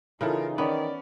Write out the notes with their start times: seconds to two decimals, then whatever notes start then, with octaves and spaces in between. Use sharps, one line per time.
0.21 C#3 E3 D#4 F4 A4 A#4
0.58 D#3 B3 C#4 D5